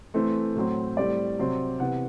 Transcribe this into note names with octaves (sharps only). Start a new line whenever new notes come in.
E3 A3 C4
A2 F#3 C4
A2 G3 C4 D5
C3 F#3 C4
C3 E3 B3 F#5